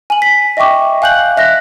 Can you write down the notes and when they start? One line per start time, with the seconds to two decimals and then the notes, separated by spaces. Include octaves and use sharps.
0.10 G#5 F#7
0.22 B6
0.57 D#5 E5 G5 C#6 D6
1.02 F5 G#5 F#6 G6 F#7
1.37 D#5 E5 F#6 A#6